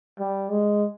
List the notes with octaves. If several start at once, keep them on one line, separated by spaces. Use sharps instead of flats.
G3
G#3